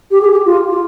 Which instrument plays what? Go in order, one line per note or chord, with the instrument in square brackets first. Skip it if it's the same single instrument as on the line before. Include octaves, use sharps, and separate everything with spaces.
[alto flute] G4
G#4
G4
F4
F4